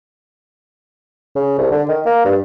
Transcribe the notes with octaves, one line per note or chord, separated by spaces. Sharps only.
C#3
C2
D3
D#3
A#3
G2